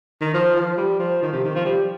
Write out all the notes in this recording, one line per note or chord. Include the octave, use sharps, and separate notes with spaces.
D#3
F3
F3
G3
F3
D#3
C3
D#3
F3
G3